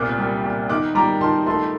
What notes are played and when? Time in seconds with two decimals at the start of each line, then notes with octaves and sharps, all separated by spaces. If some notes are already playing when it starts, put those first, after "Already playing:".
Already playing: C2 A#2 D6 F#6
0.18 G3
0.44 A#2
0.69 D#3 D6 F#6
0.95 G3 A#5 D6
1.21 D#3 A5 C6
1.46 A3 A5 C6